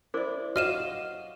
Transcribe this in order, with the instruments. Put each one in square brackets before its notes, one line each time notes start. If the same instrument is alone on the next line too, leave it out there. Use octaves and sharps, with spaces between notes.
[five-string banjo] E4 D5 [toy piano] A#4 C5 D6
[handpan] F#4 [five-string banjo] D#5 F5 [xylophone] F6 D#7 E7